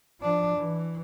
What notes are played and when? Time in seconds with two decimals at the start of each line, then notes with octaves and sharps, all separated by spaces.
0.20 F3 D4
0.55 E3